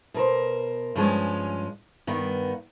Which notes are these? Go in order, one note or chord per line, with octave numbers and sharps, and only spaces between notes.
B2 A#4 C5
G2 F3 G#3 C#4
G2 D#3 B3